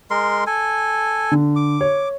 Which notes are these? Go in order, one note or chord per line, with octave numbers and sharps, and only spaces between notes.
G#3 A#4 C6
A4 G#5
D3
D6
C#5